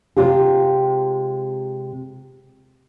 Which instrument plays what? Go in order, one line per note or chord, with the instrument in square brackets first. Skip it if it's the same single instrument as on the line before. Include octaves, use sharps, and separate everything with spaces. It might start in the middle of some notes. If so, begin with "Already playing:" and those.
[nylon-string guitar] C3 G#3 F4 G4 G#4